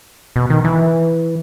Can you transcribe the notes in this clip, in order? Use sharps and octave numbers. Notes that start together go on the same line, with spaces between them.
B2
D#3
E3